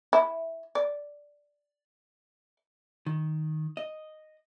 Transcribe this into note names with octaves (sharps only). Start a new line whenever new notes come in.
E4
D5
D#3
D#5